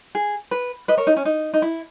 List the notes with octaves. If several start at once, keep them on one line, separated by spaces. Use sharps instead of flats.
G#4
B4
B4 D#5
A#4 C#5
D#4
C#4
D#4
D#4
E4